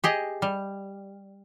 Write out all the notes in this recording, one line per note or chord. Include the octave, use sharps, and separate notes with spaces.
G4 G#4 D#5
G3